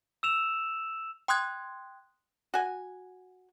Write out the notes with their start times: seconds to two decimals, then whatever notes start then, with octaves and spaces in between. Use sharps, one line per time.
0.23 E6 E7 F7
1.28 G5 C6 D#6 F#6 G#6
2.54 F#4 G#5